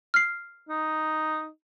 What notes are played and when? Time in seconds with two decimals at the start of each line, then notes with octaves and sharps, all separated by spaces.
0.14 F6 C7
0.69 D#4